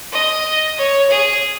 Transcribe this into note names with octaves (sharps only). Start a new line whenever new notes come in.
D#5
C#5
G#4